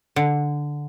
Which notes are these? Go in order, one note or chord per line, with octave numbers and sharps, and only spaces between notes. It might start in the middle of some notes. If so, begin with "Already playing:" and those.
D3